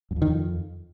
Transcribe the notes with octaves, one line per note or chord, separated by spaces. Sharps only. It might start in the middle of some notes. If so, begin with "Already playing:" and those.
F#2
F2
D#3
F2